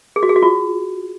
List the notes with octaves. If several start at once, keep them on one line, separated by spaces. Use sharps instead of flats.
G#4
F#4
G#4
F#4
F4